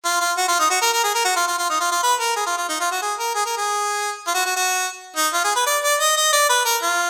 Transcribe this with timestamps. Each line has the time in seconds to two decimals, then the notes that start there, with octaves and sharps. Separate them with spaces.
0.05 F4
0.21 F4
0.37 F#4
0.48 F4
0.59 D#4
0.70 F#4
0.81 A#4
0.93 A#4
1.04 G#4
1.15 A#4
1.25 F#4
1.36 F4
1.48 F4
1.59 F4
1.70 D#4
1.80 F4
1.92 F4
2.03 B4
2.20 A#4
2.36 G#4
2.46 F4
2.57 F4
2.69 D#4
2.80 F4
2.92 F#4
3.02 G#4
3.19 A#4
3.35 G#4
3.46 A#4
3.57 G#4
4.27 F4
4.34 F#4
4.45 F#4
4.56 F#4
5.16 D#4
5.33 F4
5.44 G#4
5.56 B4
5.66 D5
5.83 D5
6.00 D#5
6.17 D#5
6.33 D5
6.50 B4
6.65 A#4
6.82 F4